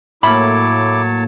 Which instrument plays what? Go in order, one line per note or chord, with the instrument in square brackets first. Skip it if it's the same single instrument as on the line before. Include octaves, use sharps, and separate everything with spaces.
[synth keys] A2 A#3 [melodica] F#3 C#5 A5 [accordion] E4 D6 [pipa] B5